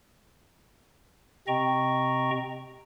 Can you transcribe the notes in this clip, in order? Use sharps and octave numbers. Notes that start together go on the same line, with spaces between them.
C3 C4 D#5 G5 A#5 C#6